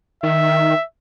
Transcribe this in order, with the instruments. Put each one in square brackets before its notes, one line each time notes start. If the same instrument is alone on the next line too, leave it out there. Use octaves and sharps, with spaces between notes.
[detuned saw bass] D#3 [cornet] E5